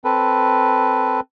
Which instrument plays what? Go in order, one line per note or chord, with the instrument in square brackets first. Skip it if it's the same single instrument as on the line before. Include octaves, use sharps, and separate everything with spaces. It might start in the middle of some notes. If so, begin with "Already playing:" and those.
[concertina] C4 A4 B4